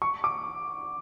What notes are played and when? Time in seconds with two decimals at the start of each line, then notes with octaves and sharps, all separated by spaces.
0.02 C#6
0.24 D6